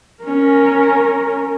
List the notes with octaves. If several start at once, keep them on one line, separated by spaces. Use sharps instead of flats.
C#4 A#4